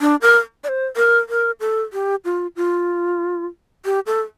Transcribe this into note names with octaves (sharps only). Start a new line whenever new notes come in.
D4
A#4
D5
C5
A#4
A#4
A4
G4
F4
F4
G4
A4